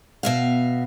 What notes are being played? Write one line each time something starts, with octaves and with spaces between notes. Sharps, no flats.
B2 E5 F5